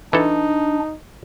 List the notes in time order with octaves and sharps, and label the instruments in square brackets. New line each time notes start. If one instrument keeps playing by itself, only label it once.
[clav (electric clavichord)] E3 A4 [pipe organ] D4 [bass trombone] D#4